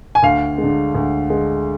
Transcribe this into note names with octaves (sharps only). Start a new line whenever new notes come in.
G#5
D2 F5
D3 G#3
D2
D3 G#3